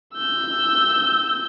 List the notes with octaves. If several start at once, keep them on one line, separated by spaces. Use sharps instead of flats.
E6 G6